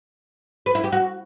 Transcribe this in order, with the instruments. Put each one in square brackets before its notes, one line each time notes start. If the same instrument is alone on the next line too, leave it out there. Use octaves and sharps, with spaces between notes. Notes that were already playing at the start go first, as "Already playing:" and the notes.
[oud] B4
E4
G4
F#4